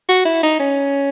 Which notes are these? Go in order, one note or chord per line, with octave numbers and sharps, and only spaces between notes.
F#4
E4
D#4
C#4